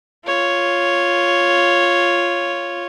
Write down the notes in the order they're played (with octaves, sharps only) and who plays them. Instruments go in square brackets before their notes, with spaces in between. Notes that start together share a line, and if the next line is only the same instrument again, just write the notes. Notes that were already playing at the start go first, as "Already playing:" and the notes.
[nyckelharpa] F4 C#5